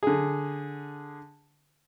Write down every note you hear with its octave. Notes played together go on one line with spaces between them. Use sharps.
D3 G#4